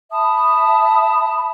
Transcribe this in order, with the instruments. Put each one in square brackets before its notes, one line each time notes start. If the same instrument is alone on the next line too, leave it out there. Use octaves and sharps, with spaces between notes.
[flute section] E5 A5 B5 D#6